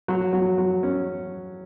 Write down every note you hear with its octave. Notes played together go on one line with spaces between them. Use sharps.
F#3
F#3
F#3
C#4